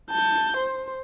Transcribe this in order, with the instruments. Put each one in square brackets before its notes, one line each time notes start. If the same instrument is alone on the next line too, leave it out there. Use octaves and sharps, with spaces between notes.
[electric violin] A5 G6
C5